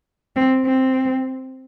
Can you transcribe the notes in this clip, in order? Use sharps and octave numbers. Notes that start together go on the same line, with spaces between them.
C4
C4